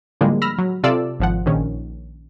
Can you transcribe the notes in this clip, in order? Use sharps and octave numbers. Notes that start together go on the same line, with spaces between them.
A2 D3 F3 G3 G#3 A#3
B5 E6 F6 A#6
F#3
C3 F4 A4 D5 E6
G#1 F3 F#5
A#1 D#3 C#4